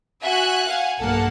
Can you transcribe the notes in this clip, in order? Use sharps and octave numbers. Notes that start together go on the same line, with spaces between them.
F#4 E5 G#5 F#6
F5 F#5 G#5
B1 G2 A#3 A4 F#5 A5